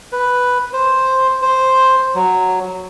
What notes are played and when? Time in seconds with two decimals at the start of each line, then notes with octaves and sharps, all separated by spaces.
0.12 B4
0.73 C5
1.42 C5
2.15 F#3